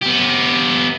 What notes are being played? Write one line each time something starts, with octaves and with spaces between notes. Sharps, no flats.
B3 G4